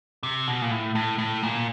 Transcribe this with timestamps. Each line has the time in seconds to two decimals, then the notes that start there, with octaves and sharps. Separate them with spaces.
0.23 C3
0.48 B2
0.62 A#2
0.71 A2
0.95 A2
1.18 A2
1.43 A#2